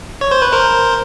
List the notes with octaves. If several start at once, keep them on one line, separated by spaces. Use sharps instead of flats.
C#5
C5
B4
A#4 C5